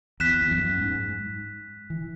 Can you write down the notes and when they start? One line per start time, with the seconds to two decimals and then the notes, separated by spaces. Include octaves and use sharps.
0.20 E2 F#6 B6 E7
0.41 E2
0.51 F#2
0.81 G#2
1.90 E3